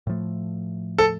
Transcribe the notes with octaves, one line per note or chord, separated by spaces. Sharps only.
A2 F3 A3
A4